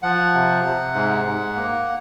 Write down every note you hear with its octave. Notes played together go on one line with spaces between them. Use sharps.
F3 F#5
C3
C3
G#2
G#2
A#3